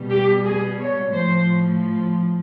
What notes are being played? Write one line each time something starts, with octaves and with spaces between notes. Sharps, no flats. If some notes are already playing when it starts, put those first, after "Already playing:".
Already playing: B2 G3
G4
G#4
C#5
A2 F3 C5